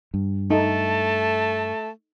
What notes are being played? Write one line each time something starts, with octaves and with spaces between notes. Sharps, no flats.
G2
A3 D#4 A4 A5